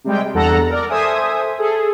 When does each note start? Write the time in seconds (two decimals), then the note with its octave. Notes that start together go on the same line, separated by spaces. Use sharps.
0.04 C3 G3 G#3 G5
0.34 E2 G2 A4 F#5 A#5 A#6
0.69 A#4 D5
0.89 A4 C5 E5 G#5 D#6
1.58 G#4 A4